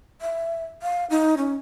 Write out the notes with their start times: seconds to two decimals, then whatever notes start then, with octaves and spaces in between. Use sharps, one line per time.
0.21 E5
0.82 F5
1.10 D#4
1.37 C#4